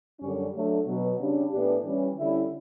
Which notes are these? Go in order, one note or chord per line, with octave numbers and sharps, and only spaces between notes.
F#2 D3 G3 C#4
F#3 A3 D4
B2 F#3 B3
C#3 G3 D4
A2 E3 B3 D4 G4
E3 G3 C#4
D3 G3 C#4 E4